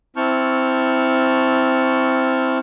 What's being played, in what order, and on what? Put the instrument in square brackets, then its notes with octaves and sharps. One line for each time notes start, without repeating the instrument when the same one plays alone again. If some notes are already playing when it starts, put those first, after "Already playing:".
[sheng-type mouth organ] C4 E4 A5 C#6 F6 G6